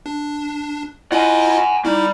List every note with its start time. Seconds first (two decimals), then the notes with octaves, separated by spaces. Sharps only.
0.06 D4
1.12 E4 F4 D#5 F#5 G#5
1.85 G3 D#4 E4